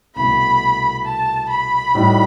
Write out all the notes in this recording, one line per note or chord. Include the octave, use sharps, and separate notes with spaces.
C2 B2 A3 B5
A5
B5
A2 G3 D#4 F#4